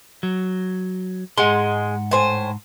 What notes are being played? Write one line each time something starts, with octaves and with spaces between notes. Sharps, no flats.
F#3
G#2 G#3 F#5 C6
A2 C5 G#5